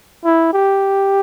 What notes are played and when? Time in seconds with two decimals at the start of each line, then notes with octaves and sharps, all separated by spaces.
0.25 E4
0.54 G4